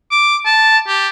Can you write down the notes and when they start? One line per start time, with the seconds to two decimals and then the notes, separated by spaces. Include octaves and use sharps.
0.11 D6
0.46 A5
0.88 G4